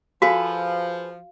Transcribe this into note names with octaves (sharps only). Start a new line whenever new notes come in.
F3 F#4 G#4 A4 B4 F5